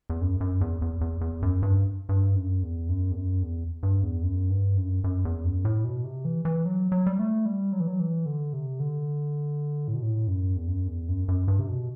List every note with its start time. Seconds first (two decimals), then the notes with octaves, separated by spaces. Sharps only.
0.10 E2
0.21 F#2
0.41 F#2
0.61 E2
0.82 E2
1.01 E2
1.21 E2
1.42 F#2
1.63 G2
2.09 G2
2.36 F#2
2.63 E2
2.89 F#2
3.12 E2
3.16 F#2
3.43 E2
3.83 G2
4.03 E2
4.23 F#2
4.50 G2
4.77 F#2
5.04 F#2
5.25 E2
5.44 F#2
5.65 A2
5.84 B2
6.04 C3
6.25 E3
6.45 E3
6.65 F#3
6.92 F#3
7.07 G3
7.19 A3
7.46 G3
7.73 F#3
7.80 E3
7.88 F#3
8.00 E3
8.26 D3
8.53 C3
8.80 D3
9.88 A2
9.95 B2
10.02 A2
10.28 F#2
10.56 E2
10.68 F#2
10.87 E2
11.09 F#2
11.28 F#2
11.48 G2
11.59 C3
11.68 B2